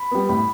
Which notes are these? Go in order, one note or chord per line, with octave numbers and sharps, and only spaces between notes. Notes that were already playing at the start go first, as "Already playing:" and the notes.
Already playing: B5
G3 B3
A2 B5